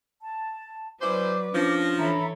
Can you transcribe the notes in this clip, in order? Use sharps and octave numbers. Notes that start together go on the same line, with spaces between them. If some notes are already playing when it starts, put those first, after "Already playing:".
A5
F#3 C#4 E4 B4 C5 D5 D6
F3 C#4 D4 A#6
E3 A4 C#5 E5 A#5 B5